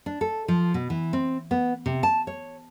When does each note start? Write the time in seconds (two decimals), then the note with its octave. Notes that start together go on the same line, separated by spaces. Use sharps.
0.06 D4
0.21 A4
0.48 F3
0.74 B2
0.90 E3
1.13 C4
1.51 B3
1.86 C3
2.03 A5
2.27 C#5